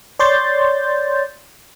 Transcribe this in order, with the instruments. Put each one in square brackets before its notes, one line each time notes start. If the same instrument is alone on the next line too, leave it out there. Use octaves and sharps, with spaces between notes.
[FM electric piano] C#5 D5 C6 G6 A6